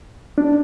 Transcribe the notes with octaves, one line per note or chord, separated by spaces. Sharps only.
D4